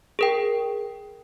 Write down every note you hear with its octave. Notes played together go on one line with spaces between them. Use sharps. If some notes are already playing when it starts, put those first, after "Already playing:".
G#4 A#4 G5